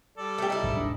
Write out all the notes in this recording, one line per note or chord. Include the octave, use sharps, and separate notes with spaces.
G3 A4 D5
A3 G4
D#4 E4
B1 G#2 F#3
E1 G#2 D4